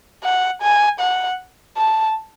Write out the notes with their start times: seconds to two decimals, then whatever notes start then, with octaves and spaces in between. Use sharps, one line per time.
0.24 F#5
0.62 G#5
1.00 F#5
1.78 A5